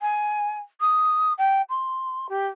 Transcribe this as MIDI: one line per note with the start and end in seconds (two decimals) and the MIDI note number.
0.01 0.56 80
0.81 1.33 87
1.38 1.62 79
1.70 2.27 84
2.29 2.47 67